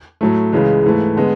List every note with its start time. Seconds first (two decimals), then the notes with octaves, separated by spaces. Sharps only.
0.21 A2 F#3 A3
0.53 C#2 C#3 E3 G#3
0.84 G#2 E3 A3
1.16 D3 G#3 B3